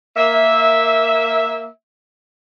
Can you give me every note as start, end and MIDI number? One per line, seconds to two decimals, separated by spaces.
0.17 1.67 58
0.17 1.67 76